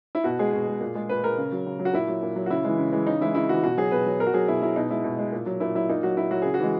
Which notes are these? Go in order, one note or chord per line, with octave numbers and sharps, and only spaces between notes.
E4
B2 F#4
G#3 G#4
B2
G#3
A#2
G#3
A#2 B4
G#3 A#4
C#3
F#3
C#3
F#3
F#4
A#2 E4
F#3
A#2
F#3
F#4
C#3 E4
E3 G#3
C#3
E3 G#3
C#3 D#4
E3 G#3 E4
C#3 E4
E3 G#3 F#4
B2 F#4
F#3 G#4
B2 B4
F#3
B2 A#4
F#4
F#3 G#4
B2 E4
F#3 E4
B2 D#4
G#3 E4
B2
G#3
A#2
F#3
A#2 E4
F#3 E4
A#2 D#4
F#3 F#4
A#2 E4
F#3 F#4
C#3 G#4
F#4
E3 G#3